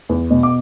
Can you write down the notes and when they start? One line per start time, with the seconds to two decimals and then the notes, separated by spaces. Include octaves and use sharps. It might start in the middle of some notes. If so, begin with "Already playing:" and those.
0.09 E2
0.31 B2
0.43 D6